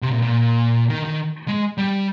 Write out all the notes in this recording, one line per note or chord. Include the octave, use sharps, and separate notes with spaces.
C3
A#2
A#2
D#3
D#3
G#3
G3